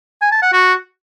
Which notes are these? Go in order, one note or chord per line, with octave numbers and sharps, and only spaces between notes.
G#5
A5
F#5
F#4